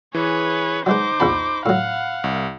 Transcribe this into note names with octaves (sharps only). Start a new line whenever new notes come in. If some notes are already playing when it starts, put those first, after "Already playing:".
E3 G#4 B4 C#5
F#3 G#3 D#4 B4 C5 D6
A#1 E2 A5 B5
A2 F#3 F5 F#5
C2